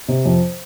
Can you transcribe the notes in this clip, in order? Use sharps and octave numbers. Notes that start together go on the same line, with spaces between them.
C3
F2